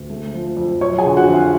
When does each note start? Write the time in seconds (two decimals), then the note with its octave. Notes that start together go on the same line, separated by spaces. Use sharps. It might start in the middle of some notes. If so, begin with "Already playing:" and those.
Already playing: D2
0.10 A3
0.34 F3
0.57 F2
0.81 F#3 C#5 C#6
0.98 G#4 G#5
1.05 D3
1.17 F#4 F#5
1.28 F2
1.34 F4 F5